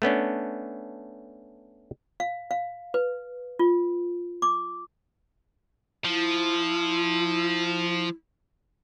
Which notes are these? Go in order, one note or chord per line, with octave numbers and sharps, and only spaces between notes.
A3 B3 C#4 D4
F5
F5
B4
F4
D6
F3 E4